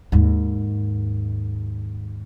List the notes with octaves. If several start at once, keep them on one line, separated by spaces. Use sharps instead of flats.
D#2 G#2